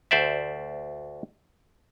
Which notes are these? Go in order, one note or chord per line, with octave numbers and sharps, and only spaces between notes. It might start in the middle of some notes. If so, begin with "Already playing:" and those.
D2 C5 D5 E5